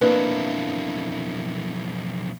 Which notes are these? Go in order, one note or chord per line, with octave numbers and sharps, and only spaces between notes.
B1 F2 A#3 D4 E4 B4